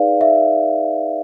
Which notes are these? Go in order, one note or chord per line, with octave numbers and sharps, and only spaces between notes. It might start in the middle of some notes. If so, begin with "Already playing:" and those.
Already playing: D#4 G#4 B4 D5 F5
E5